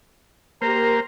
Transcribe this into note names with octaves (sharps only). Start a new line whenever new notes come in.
A#3 G4 A#4 C5 A#5